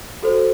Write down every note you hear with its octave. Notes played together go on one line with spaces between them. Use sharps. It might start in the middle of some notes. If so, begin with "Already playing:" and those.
F#4 A4 C5